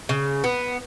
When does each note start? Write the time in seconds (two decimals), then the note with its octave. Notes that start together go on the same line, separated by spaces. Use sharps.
0.09 C#3
0.44 B3